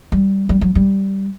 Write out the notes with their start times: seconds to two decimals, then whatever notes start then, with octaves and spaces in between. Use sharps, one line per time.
0.12 G3
0.49 G3
0.61 F#3
0.75 G3